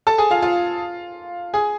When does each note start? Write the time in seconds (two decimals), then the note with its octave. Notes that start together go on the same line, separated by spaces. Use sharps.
0.07 A4 A5
0.18 G#4 G#5
0.30 F4 F5
0.42 F4 F5
1.54 G#4 G#5